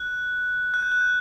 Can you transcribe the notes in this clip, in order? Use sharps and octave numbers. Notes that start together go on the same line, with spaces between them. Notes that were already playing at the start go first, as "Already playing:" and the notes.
Already playing: F#6
F#6
G6
F#6
G6